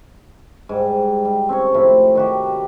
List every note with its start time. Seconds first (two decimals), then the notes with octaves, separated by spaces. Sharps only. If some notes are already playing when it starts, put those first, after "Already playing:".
0.69 G#2 G3
1.25 G3
1.49 C4 C#4 A4 C#5
1.75 A2 C3 F3 B5
2.15 D#3 F#4 G4